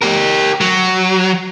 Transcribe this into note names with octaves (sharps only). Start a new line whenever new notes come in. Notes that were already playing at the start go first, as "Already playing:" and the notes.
G4 A#4
F#3